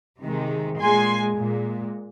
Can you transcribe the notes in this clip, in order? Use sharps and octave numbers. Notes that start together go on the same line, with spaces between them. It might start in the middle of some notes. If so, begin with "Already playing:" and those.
C3 D#3 G#3
A#2 G#3 G#5 C6
A#2 G#3